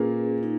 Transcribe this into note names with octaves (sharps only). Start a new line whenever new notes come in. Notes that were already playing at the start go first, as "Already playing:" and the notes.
Already playing: A#2 A#3 C#4 G#4 B4
D#4